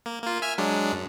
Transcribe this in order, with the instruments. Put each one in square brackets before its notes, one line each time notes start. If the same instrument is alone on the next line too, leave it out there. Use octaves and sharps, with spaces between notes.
[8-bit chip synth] A#3
A#3 F4
E5 G#5 F6
F#3 G#3 D4
F#2